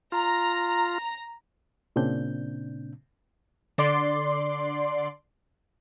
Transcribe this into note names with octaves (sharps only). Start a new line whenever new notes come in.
F4 A#5
A#2 C#3 C4 D4 G6
D3 D5 C6